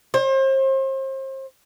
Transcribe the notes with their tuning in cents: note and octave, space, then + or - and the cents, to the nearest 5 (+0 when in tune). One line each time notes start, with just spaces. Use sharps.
C5 +35